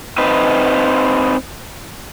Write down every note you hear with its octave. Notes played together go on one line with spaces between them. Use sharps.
C4 D#4 B4